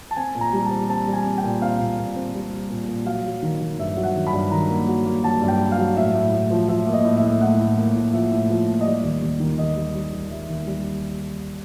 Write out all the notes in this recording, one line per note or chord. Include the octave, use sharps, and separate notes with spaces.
A5
C4 G#5
A#2
A#5
G3
A5
C4
C4 A5
G3
G#5
C4
G5
A#2
C4 F5
A#2
A#2
C4
G3
G3
A#2
A#2
F#3 F5
F#3
D#3
D#3
G2 E5
F#3
F#5
D#3
B5
G2
D#3 A#5
A#3
F#3
A#3
F#3 A5
G2
G5
F#3
F5
F#3
A2 E5
A2
A2
F3
F3 E5
A#3
D#5
A2
E5
A2
A2 F#5
A2
A#3
A2
F3 E5
A2
F3
A#3
D#5
G3 D5
D#2
D#2
D#3
D#2 D#5
G3
G3
D#3
G3 E5
D#2
G3